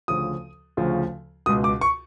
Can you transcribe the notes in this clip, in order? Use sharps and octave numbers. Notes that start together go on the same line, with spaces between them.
D2 C#3 F3 D#6
D2 C#3 F3
C#2 B2 D#6
D6
C#6